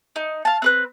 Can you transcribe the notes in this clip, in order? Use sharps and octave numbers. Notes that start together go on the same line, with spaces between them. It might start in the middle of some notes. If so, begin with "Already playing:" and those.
D#4
F5 A5
C4 B4 F#6